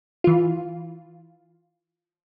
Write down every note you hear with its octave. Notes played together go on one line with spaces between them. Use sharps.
E3 F4